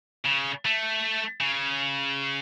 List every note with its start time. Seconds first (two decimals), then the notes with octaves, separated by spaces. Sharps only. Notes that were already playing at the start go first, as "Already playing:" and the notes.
0.25 C#3
0.65 A3
1.41 C#3